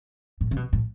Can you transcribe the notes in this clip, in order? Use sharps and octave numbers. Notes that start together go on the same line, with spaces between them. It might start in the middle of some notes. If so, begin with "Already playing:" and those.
A2
C#3
B2
A2